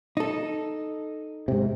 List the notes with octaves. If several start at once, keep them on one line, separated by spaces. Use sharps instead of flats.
D#4 A4
G#2 C3